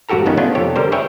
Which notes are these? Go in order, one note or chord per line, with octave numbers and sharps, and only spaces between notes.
G#1 G2 F#4 G4 A4 A#5
F2 D#3 B3 C#4 D#4
A3 B3 C#4 D4 F4 G#4
F2 C3 G4 A4 C#5
D3 G3 A#4 C5
G#4 B4 C#5 D5 E5 G5